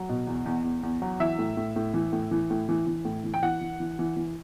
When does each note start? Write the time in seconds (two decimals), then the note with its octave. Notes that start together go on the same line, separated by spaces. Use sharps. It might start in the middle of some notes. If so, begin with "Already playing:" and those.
Already playing: F#3
0.09 B2
0.27 E2
0.46 E2
0.64 E2
0.83 E2
1.02 F#3
1.20 E3 E5
1.39 A2
1.57 A2
1.76 A2
1.94 E3
2.13 A2
2.31 E3
2.50 A2
2.69 E3
2.87 E3
3.05 A2
3.24 E3
3.34 G5
3.43 E3 F#5
3.61 E3
3.80 E3
3.99 E3
4.17 E3